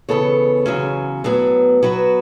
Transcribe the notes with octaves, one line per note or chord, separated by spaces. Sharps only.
C#3 E3 B3 A4 C#5
E2 C#3 F#3 C#4
A2 F#3 B3
F#3 B3 F#4 B4